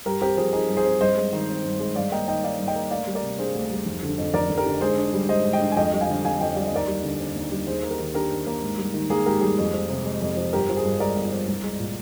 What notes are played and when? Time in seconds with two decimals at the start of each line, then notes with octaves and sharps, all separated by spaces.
0.06 G2 G4 A#4
0.21 C4 G4 A#4
0.37 F3 G#4
0.53 D#4 G#4
0.69 G2
0.77 G#4 C5
0.85 C4
1.00 G2 C5 D#5
1.17 G#3
1.33 D#3
1.49 C4
1.64 G2
1.80 G#3
1.96 G2 D5 F5
2.12 A#3 D#5 G5
2.28 D#3 D#5 G5
2.44 D#4 D5 F5
2.59 G2
2.68 D#5 G5
2.76 A#3
2.91 D2 D5 F5
3.07 G3
3.15 A#4 D5
3.23 C3
3.38 D4 G#4 C5
3.55 D2
3.71 G3
3.86 F1
4.03 D3
4.18 F2
4.33 F1 A#4 D5
4.50 F1
4.58 G4 A#4
4.66 D3
4.81 G#2 G#4 C5
4.98 D4
5.14 G3
5.29 G#2 C5 D#5
5.46 G#2
5.53 D#5 G5
5.61 D4
5.72 G#5
5.77 F2 D#5 G5
5.93 G3
6.01 F5 G#5
6.08 D3
6.25 F2 F5 G#5
6.41 F2 D#5 G5
6.56 G3 D5
6.66 D#5
6.72 D#2 A#4 D5
6.88 G3
7.04 D3
7.20 C4
7.35 D#2
7.52 G3
7.67 D#2 G#4 C5
7.83 A#3
7.91 G4 A#4
7.99 D#3
8.14 D4 G4 A#4
8.31 D#2
8.47 A#3
8.63 G#2
8.78 G3
8.94 D#3
9.10 A#3 G#4
9.26 G#2 G4 A#4
9.41 G3 G#4
9.58 F2
9.73 F3
9.90 C3
10.05 G#3
10.21 F2
10.37 F3
10.53 G1 G4 A#4
10.69 F3
10.76 G#4 C5
10.85 G2
11.00 G#3 A#4 D5
11.16 G1
11.32 F3
11.48 C2
11.64 G#3
11.80 A#2